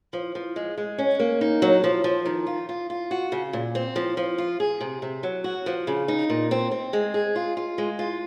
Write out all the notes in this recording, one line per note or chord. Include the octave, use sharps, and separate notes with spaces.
F3
F3
G#3
G#3
C#4
A#3
D#4
F#3
F3
F3
D#3
F4
F4
F4
F#4
C#3
A#2
C4
F3
F3
F4
G#4
C3
C3
F#3
F#4
F3
C#3
D#4
A#2
C4
C4
G#3
G#4
F4
F4
G#3
F4